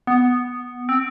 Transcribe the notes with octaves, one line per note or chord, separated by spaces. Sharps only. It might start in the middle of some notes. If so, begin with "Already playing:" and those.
B3
C4